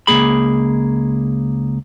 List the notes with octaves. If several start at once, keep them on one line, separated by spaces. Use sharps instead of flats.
C#2 C#3 A#3 G#4 B5